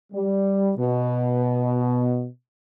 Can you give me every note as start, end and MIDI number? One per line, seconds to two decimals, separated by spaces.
0.13 0.70 55
0.78 2.27 47